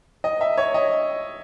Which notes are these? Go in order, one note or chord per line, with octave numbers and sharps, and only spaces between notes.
D#5
E5
C#5
D#5